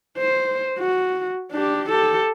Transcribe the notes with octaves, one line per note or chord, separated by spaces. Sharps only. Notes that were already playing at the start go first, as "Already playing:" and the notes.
C5
F#4
D4 G4
G4 A4